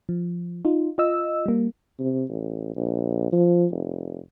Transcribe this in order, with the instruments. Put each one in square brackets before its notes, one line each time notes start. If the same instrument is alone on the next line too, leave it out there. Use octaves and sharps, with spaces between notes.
[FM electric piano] F3
D#4 F4
F4 D#5 E6
G3 A#3
[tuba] C3
A1
A#1
F3
F1